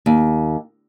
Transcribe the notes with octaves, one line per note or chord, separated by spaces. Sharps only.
D#2